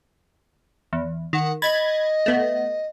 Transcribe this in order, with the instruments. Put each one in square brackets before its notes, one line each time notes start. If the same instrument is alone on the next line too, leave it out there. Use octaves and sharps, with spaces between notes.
[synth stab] E2
[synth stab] D#3 [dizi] F#5
[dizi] D#5 [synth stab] B5 G#6 A6
[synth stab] A3 B3